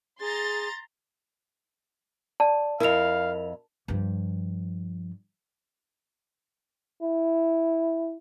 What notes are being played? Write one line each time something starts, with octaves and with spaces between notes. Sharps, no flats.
G#4 A#5 C6 A6
D5 A5
F2 E4 A#4 F5 F7
G2 F3
E4